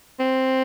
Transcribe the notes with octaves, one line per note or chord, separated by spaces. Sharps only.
C4